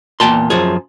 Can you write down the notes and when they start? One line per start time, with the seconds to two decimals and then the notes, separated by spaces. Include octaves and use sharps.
0.20 E2 A#2 G5 A5 C6
0.50 F#2 F3 G#4